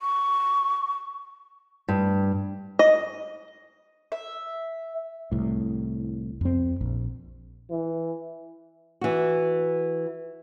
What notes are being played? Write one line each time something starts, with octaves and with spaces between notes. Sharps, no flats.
C#6
G2
D#5
E5
C2 A2
F2 C4
A#1
E3
E3 F#4